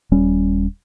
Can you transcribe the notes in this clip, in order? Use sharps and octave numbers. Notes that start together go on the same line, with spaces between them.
D#1 G3 C#4